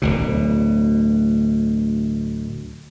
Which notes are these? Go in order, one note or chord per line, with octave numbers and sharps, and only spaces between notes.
D1 G1 D2 B2